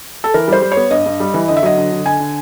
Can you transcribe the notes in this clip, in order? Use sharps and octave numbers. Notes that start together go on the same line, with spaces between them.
A4
E3 A#4
G3 C5
G3
C#5
B3
G2 D#5
G2
G3
E3
D3 D#5
E5
F#3 D#5
D3
D3
D3 G#5
D3